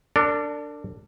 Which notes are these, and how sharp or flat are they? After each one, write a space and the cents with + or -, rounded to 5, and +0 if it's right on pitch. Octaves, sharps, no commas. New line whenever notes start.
D4 +0 A#4 -45 D5 +0